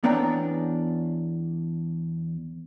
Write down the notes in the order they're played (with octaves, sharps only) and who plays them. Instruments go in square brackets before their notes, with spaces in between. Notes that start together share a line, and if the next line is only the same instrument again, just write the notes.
[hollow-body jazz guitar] E2 B3 C#4 D4 G5 A#5